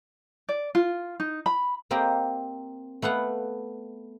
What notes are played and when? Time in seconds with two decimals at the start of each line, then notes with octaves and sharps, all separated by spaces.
0.49 D5
0.75 F4
1.20 D#4
1.46 B5
1.91 A#3 C4 G4 D#5 F5
3.02 A3 B3 F5 F#5